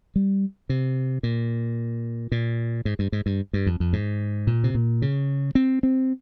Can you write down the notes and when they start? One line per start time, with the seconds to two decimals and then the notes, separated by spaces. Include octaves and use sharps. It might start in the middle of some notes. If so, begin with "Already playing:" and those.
0.16 G3
0.69 C3
1.23 A#2
2.32 A#2
2.85 G#2
2.99 G2
3.12 G#2
3.26 G2
3.53 G2
3.66 F2
3.80 F2
3.93 G#2
4.47 A#2
4.64 C3
4.75 A#2
5.02 C#3
5.55 C4
5.83 C4